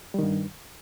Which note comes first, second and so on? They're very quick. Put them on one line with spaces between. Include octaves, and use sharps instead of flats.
G3 D#3 G2